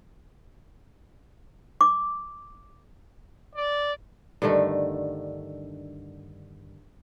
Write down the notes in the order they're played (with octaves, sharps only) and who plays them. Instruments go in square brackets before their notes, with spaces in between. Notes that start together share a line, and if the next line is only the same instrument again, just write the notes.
[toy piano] D6
[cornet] D5
[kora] G2 D3 D#3 A3